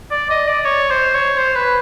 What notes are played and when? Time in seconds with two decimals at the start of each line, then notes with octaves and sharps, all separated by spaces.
0.11 D5
0.30 D#5
0.48 D5
0.66 C#5
0.90 C5
1.14 C#5
1.38 C5
1.56 B4